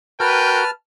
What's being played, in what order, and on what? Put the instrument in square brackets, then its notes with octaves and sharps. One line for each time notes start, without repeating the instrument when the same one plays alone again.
[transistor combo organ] F#4 A#4 [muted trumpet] B4 [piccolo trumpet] G5 [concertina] A5 F6